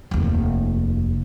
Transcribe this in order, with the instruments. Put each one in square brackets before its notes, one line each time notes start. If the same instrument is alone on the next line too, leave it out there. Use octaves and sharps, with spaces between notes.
[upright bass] F1 D#2